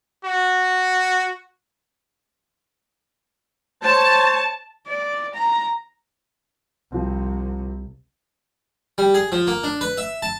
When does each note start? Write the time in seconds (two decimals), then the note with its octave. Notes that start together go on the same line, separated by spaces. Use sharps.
0.24 F#4
3.83 C5 C#5 A5
4.88 D5
5.35 A#5
6.92 C2 F3 C4
8.98 G3
9.14 G#4
9.32 F3
9.47 A#3
9.64 D4
9.81 B4
9.97 E5
10.22 A5